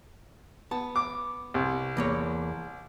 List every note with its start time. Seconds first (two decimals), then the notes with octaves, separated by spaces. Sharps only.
0.71 B3 A5
0.96 D6
1.54 C2
1.97 E2 A#3 C#5